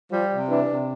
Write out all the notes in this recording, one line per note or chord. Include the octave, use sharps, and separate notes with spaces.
F3 G3
C3
E3 D4
C3